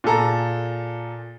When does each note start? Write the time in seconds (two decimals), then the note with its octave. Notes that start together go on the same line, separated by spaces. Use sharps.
0.04 A#2 G#4 A4 A#5